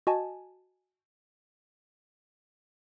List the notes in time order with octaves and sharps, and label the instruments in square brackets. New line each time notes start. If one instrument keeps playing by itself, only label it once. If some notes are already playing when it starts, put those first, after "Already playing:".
[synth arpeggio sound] F#4 D#5 G#5 A5